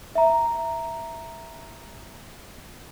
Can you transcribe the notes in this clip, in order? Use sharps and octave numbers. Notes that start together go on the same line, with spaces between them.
E5 A#5